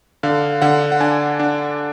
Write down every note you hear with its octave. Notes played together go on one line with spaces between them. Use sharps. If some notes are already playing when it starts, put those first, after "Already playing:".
D3 F5
D3 F#5
F#5
D4 G#5
D4